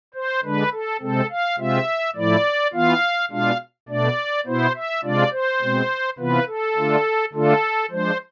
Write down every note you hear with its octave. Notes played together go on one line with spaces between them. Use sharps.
C5
D3 G#3 D4 B4
A4
C3 G#3 C4 A4
F5
C3 G#3 C4 F4 E5
A2 F3 A3 E4 D5
E3 B3 F4 F5
B2 G#3 D4 F4 F5
B2 A3 D4 D5
B2 B3 E4 C5
E5
C3 G#3 D4 F4 D5
C5
B2 G#3 C4
C3 E3 B3 F4 B4
A4
D3 A3 D4 F4
D3 A3 D4 F4 A4
F3 G#3 D4 C5